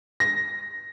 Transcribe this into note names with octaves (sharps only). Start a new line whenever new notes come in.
A#6